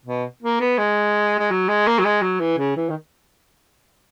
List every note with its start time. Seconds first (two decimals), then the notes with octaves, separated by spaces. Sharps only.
0.05 B2
0.42 A#3
0.60 B3
0.78 G#3
1.39 G#3
1.51 F#3
1.68 G#3
1.87 A#3
1.99 F#3
2.05 G#3
2.22 F#3
2.40 E3
2.58 C#3
2.76 E3
2.89 D#3